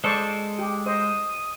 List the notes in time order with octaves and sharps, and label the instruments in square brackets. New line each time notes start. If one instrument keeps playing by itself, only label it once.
[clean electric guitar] G#3 A4 [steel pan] C5 D5 C#6
[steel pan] G4
[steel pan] C5 D#5 [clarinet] D#6